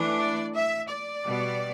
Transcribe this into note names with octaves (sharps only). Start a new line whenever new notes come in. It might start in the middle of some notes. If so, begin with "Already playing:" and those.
Already playing: E3 A3 D4
D5
E5
D5
B2 G3 B3